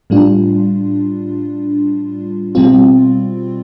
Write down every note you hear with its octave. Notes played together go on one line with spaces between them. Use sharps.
A2 G3 D4 F4
B2 G3 C4 F4